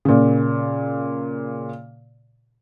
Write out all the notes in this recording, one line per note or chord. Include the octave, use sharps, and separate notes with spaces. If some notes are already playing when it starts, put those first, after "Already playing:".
A#2 C#3